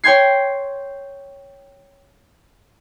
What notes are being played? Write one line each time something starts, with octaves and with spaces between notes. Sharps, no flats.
C#5 G5 C6 G#6 C7